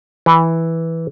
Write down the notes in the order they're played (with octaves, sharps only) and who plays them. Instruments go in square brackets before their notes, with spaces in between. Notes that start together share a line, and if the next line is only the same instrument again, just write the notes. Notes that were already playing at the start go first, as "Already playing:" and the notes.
[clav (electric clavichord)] E3